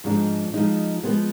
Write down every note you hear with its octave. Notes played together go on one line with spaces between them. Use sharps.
G#2 F3 G#3 D4
F3 G#3 D#4
F3 G#3 B3